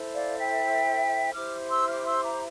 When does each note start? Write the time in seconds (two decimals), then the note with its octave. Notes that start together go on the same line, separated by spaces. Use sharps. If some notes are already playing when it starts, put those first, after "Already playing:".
Already playing: E4 A4 C5
0.14 D5 F5
0.37 E5 G5
1.33 E4 G4 C5 D6 F6
1.69 C6 E6
1.88 D6 F6
2.06 C6 E6
2.24 A#5 D6